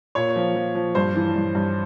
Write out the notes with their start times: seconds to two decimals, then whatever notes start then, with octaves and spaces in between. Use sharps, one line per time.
0.15 A#2 C#5
0.36 F3
0.56 F3
0.75 F3
0.95 G2 C5
1.15 E3
1.36 G2
1.55 G2